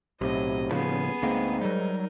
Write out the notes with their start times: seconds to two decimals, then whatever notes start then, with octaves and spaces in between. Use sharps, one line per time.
0.21 B1 A2 C3 F#3 D#5
0.71 D#1 A2 C#3 F3 B3 G#4
1.22 D2 G#2 A#3 C4
1.61 F#3 G3 D#4 A#4